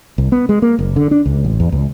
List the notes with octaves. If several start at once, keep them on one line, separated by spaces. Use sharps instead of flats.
C2
B3
G#3
A#3
F#1
D3
D4
C#2
A1
E2
C#2